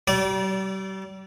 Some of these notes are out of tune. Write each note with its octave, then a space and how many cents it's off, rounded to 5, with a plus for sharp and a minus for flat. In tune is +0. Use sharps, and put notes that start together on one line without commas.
G3 -40 D5 -20 D6 +0